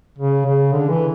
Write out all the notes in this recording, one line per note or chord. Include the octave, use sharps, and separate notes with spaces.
C#3
C#3
D3
E3